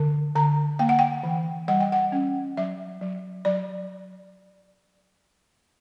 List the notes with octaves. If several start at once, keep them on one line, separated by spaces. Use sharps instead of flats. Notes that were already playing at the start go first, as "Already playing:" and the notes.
Already playing: D3
D3 A#5
A#3 G5
F#5
G5
E3
G3 F#5
G5
F#5
C#4
F#3 E5
F#3
F#3 D5